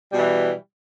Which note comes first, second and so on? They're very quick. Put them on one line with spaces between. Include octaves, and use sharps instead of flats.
G3 B2 E3